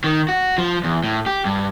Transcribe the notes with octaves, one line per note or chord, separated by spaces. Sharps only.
D#3
F#4
F3
E2
A2
G4
G2